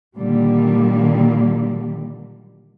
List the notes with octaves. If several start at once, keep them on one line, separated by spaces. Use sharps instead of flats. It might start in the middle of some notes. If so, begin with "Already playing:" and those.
A#2 D3 D#3 F#3 G3 A#3